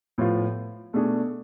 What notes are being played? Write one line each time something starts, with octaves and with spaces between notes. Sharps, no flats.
A2 F3 B3 F4
B2 A3 D4 G#4